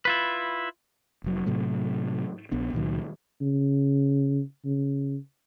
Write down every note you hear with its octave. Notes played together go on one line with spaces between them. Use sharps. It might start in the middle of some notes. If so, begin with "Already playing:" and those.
E4 F4 B4
F1 F#3
A2 C3 F#3 A3
A#1 B3 D4
C#2 A#2 D#3 F#3
C#3
C#3